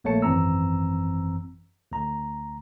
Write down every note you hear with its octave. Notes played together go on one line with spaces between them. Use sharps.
A#1 A3 A#3 C#5 A5 C#7
G#1 F#2 E3 C4 A#5 E6
D2 A#5